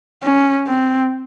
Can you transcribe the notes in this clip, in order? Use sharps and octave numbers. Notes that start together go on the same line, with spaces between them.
C#4
C4